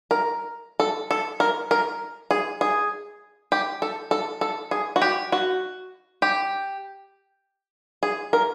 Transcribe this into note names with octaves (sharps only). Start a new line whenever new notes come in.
A#4
A4
A4
A#4
A#4
G#4
G#4
G4
A4
A4
A4
G#4
F#4
G4
F#4
G4
G#4
A#4